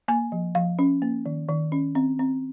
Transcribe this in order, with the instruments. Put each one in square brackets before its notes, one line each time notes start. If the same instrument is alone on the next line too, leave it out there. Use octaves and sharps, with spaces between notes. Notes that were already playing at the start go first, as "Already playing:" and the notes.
[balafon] A#3 G#5
F3
F3 F5
C#4
A#3
D#3
D#3
C#4
C4
C4